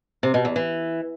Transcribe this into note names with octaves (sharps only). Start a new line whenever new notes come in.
C3
B2
E2
E3